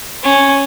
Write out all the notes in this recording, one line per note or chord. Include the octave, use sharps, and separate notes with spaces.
C#4